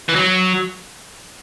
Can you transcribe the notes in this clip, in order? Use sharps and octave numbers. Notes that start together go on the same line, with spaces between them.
E3
F#3